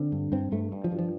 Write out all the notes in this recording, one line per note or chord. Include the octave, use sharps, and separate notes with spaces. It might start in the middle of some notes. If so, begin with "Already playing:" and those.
Already playing: D3 C4
G2
G2 C4
G2 A3
G2
F3
G2
F3